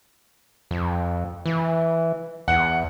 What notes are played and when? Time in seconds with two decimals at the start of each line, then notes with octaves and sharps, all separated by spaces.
0.71 F2
1.46 E3
2.48 E2 F#5